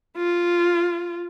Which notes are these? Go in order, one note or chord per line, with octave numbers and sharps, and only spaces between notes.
F4